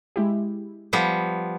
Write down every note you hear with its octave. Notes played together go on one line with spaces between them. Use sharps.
G#3 E4 G4
F3 G3 B3